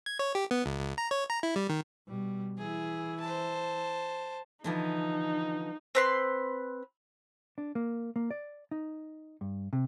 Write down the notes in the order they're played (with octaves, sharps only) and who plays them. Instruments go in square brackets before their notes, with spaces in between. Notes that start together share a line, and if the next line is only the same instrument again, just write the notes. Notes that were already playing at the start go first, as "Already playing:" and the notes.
[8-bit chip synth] G#6
C#5
G4
B3
C#2
C#2
A#5
C#5
A#5
E4
G3
D#3
[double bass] B2 G3
[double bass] E3 E4 [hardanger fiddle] G#4
[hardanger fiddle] C5 A5
[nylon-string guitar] D3 E3 F3 [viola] D#4
[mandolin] C4 B4 C6
[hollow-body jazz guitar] D4
A#3
A#3
D5
D#4
G2
C3